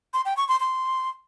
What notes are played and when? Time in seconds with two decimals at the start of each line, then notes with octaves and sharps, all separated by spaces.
0.14 C6
0.25 G5
0.37 C#6
0.49 C6
0.60 C6